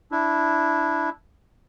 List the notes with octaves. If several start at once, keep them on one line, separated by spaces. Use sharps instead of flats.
D4 E4